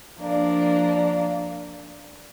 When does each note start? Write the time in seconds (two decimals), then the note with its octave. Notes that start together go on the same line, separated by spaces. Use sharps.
0.18 F3 A#3 D4